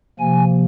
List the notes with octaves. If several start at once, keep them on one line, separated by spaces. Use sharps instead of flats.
C3 F3 A#3 G#5